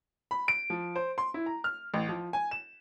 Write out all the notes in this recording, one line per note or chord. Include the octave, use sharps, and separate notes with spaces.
B5
D7
F3
C5
C6
E4
A#5
F6
A1
F3
G#5
E7